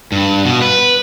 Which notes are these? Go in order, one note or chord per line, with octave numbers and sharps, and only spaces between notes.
G2
B2
B4